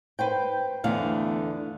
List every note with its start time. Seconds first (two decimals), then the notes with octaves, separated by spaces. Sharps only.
0.19 B4 C5 G5
0.84 E2 D3 A3 F5